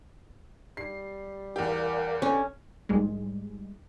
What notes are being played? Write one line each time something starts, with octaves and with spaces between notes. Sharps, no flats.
G3 C7
E2 G4 A#4 D5 F5
D3 C#4
A#1 G#2 G3 G#3